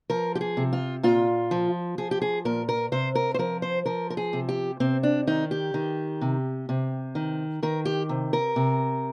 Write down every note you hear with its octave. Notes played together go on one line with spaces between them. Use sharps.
F3 A#4
G4
G#4
C3
F4
A#2 F4
F3
F3 G#4
G4
G#4
A#2 A#4
A#4
C3 C5
A#4
C5
F3 A#4
C5
F3 A#4
A#4
G#4
C3
G4
C3 C4
D4
D#3 D#4
G4
D#3
C3
C3
D#3
D#3 A#4
G4
C3
A#4
C3